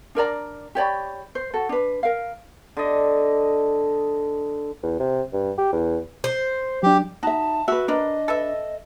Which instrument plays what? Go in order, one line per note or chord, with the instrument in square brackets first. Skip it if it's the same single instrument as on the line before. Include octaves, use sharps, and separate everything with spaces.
[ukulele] D4 A#4 D5 A#5
G4 C#5 D5 B5
C5
F#4 A4
D4 B4
A#4 F5
[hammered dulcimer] D3 D#5
[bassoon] E2
C3
G2
G4
E2
[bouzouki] C5
[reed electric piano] F#3 D4 [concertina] G4
[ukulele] D#4 E5 [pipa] F#4 [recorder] A5
[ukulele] F#4 B4 [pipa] E5
[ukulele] D4 [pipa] A#4 B4 [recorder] D#5
[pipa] A4 B4 E5